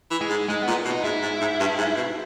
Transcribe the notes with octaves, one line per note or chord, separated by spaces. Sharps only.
E3
G#3
G#2
G#2 G#3
A#2 B3
B2
D#4
G#2 E4
G#2
G#2
G2
G#2
B2